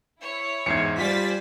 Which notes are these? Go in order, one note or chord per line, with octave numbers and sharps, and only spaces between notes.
E4 C#5
E2 G#2 E5 G#6 C7 C#7
G3 F4 C5 D5 G#5 A6 B6